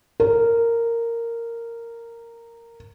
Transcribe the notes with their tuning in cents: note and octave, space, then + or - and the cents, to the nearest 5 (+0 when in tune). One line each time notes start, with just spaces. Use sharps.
A#4 -10